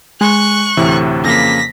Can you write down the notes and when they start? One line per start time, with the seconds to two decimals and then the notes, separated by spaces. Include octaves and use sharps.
0.21 G#3 C#6 F#6
0.77 D2 A2 C3 E3
1.24 F2 C#3 A#3 A#6 B6